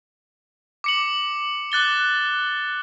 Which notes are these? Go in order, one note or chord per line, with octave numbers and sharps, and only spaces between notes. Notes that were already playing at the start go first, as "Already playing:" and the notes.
D6 C#7 F#7
D6 F#6 A6 G7